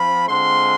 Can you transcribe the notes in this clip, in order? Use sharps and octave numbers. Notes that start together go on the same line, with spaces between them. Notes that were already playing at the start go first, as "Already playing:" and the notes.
Already playing: F3 C4 B5
D3 G#3 C4 F4 C6